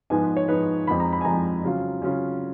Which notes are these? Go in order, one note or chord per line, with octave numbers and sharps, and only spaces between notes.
G#2 F3 B3 D#4 G#5
B4
C#5
G#2 F3 B3 D#4 B4
F2 F3 G#3 B5
A#5
B5
G#5
F2 F3 G#3 A#5
C#3 F#3 C#4 F4
C#3 F#3 C#4 F4